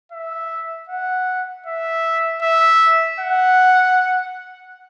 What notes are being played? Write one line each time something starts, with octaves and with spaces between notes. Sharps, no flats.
E5
F#5
E5
E5
F#5